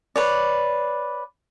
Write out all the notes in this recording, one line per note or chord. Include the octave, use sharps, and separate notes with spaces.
B4 C#5 D5